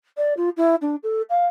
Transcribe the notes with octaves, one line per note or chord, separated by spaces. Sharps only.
D5
F4
E4
D4
A4
F5